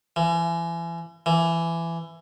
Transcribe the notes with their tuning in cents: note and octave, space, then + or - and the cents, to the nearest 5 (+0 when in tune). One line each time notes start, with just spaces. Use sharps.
E3 +35
E3 +20